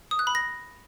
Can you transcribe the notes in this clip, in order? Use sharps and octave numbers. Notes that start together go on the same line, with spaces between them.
D#6
F#6
B5
A#6